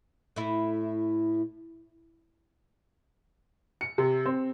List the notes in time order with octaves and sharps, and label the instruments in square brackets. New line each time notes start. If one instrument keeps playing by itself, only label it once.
[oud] A2 E4
[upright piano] C#7
C3
C4